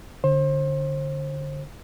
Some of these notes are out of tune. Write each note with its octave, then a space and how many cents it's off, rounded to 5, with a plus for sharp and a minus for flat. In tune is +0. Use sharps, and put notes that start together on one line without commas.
D3 -5 C5 +30